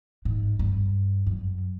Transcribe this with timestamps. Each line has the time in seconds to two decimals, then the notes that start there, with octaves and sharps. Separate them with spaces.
0.25 G#2
0.59 G2
1.26 F#2